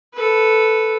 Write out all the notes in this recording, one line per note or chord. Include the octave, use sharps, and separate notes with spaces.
A4 B4